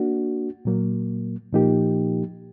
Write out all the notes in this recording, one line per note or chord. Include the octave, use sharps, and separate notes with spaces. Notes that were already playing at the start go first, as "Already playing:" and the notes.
Already playing: A#3 D4 F#4
A#2 F#3 A#3
A#2 F3 A#3 D#4 G4